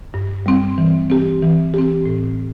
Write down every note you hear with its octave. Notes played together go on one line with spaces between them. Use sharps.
G2
G3 C4
E3
C4 G4
E3
C4 G4
A2